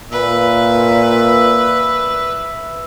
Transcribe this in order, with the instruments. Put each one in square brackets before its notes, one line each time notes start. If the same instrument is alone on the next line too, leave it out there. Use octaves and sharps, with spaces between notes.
[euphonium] A#2 [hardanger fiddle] B4 [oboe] E5